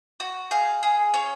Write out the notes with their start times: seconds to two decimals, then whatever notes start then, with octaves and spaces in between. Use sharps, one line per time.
0.20 F#4
0.51 G#4 F5
0.83 G#4
1.14 C#4 C#5